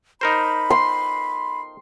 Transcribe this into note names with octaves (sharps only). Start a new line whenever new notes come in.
D#4 A#4 C5 B5
C6